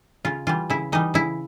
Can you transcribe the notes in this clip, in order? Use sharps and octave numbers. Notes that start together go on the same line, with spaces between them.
C#3 F4
E3 G3 F4
C#3 E4
E3 G3 D#4
C#3 E4